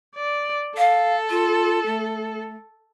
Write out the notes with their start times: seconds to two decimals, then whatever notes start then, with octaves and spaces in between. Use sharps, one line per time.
0.16 D5
0.78 A4 F5
1.30 F4
1.86 A3